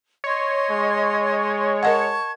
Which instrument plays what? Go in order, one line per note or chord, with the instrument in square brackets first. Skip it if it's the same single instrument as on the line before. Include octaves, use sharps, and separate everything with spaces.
[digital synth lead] C#5 [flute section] D#5 C6
[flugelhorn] G#3
[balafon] A#4 D#5 F#5 [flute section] A5 C#6 G#6